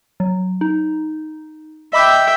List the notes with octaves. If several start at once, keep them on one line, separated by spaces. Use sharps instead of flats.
F#3
D#4
D#5 E5 G5 B5 D6